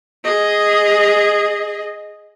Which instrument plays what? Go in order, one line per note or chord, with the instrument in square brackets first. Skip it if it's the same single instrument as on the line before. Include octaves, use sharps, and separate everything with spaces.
[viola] G#4 D#5